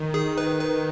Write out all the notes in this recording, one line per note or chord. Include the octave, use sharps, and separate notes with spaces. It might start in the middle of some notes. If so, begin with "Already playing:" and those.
Already playing: D#3
G#4
B4
B4